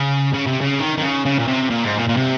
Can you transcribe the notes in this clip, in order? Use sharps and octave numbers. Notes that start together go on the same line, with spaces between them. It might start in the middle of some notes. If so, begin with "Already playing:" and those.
Already playing: C#3
C#3
C3
C#3
D#3
D#3
C#3
C#3
A#2
C3
A#2
G#2
A#2
A#2
C3